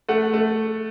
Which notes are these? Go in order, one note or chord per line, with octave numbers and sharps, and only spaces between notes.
A3 F#5
A3